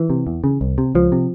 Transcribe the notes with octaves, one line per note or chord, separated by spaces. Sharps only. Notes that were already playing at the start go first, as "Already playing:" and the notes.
Already playing: E3
C3
E2
C#3
C2
C3
C#2 F3
C3